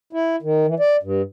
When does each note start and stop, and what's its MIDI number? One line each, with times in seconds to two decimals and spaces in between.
0.13 0.36 64
0.42 0.66 51
0.66 0.75 52
0.80 0.97 74
1.03 1.22 43